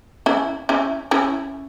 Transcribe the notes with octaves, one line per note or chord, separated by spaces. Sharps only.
C#4 E4
C#4 E4
C#4 E4